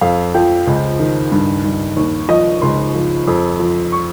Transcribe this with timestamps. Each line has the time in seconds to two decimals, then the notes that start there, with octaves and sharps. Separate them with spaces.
0.01 F2 F5
0.34 F3 G5
0.67 C#2
1.00 D#3
1.32 G2
1.65 G2
1.97 D#2
2.29 F3 D#5
2.62 C#2 C6
2.95 F3
3.27 F2
3.60 F3
3.92 C#6